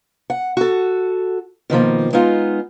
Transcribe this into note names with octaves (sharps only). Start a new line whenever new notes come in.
F#5
F#4 A4
B2 D#3 F3 A#3
G#3 B3 D#4 F4